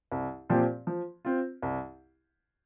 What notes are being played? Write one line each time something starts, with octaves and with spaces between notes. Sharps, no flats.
C2
A#2 F3 C4 G4
F3
C4 F4
C2